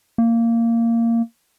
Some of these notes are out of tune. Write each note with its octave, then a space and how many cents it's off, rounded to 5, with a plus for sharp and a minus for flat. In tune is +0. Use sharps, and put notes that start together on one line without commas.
A#3 -15